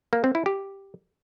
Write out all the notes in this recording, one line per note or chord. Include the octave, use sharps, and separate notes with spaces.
A#3
C4
E4
G4